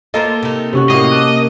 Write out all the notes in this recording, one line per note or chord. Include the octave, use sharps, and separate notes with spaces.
A#3 F4 A4 A#4 C5 D#5
C3 D#4
C3 C#4 F#4
A2 A#3 F#4 D#5 F5 D#6 F6
A5 D6 F#6